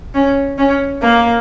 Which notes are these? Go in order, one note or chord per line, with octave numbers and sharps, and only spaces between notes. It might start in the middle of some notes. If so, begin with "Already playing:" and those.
C#4
C#4
A#3